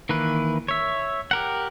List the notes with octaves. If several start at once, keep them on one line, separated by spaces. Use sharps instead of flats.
D#3 E3 A#3 B4
C#5 E5
G4 A#4 F#5